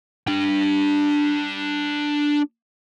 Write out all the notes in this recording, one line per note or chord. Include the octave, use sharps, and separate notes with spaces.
D4 G5